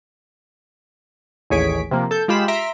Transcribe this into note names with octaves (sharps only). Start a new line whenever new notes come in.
A1 D#2 G#4 C#5 B6 D7
C3 F3 A#3
A4 G6
G#3 F4 G4 B5 E7
E5 A#5 C6 A#6 B6 D7